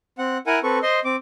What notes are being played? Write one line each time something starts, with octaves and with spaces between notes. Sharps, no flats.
C4 F#5
E4 A#4 F#5 G#5
C4 A4 B4 C#6
C5 D#5 C6
C4 D6